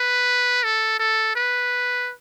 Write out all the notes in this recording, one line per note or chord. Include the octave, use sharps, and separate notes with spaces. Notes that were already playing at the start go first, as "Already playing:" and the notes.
Already playing: B4
A4
A4
B4